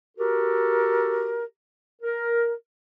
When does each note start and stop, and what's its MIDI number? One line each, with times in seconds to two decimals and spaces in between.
0.18 1.43 66
0.18 1.43 67
0.18 1.43 69
0.18 1.43 70
2.02 2.53 70